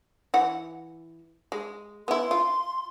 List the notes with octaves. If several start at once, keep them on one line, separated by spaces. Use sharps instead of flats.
E3 F#5
G#3
B3 E4 C6
F4